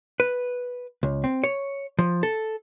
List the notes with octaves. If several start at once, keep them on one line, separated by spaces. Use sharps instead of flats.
B4
C#2
C4
C#5
F3
A4